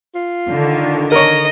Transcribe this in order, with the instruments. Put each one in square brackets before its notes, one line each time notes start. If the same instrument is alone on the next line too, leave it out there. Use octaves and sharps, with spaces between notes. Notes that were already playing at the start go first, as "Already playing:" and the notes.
[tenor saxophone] F4
[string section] D3 D#3
[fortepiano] A#4 C#5 [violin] D#5